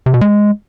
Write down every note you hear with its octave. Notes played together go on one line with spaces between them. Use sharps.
C3
B2
G#3